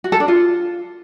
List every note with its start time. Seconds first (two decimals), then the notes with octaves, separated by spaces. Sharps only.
0.04 F#4
0.12 A4
0.20 D4
0.28 F4